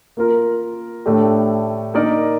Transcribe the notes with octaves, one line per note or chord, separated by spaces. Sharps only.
A#3 F4 A#4
A2 A3 D4 G4
A#3 D#4 A#4 D5